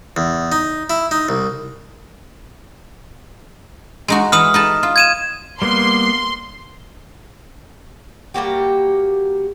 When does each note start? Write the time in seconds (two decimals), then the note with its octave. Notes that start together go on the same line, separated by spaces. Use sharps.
0.17 E2
0.52 D#4
0.90 E4
1.11 D#4
1.29 C2
4.08 G#3 D#4 F#4
4.32 E3 B4 F#5 D#6 F6
4.54 D#4 B4 A5
4.83 F4
4.96 G#6 D#7 E7
5.62 G3 A#3 B3 C6
8.34 G3 A#3 F#4 G4